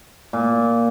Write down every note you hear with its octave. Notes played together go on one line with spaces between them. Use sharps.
A#2